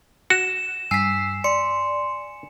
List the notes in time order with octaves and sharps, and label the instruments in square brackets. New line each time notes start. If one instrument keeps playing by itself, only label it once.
[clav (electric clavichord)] F#4 [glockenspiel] E7
[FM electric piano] G2 C7 [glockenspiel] G#5 [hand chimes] E6 B6
[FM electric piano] D5 [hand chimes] C6 [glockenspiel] C#7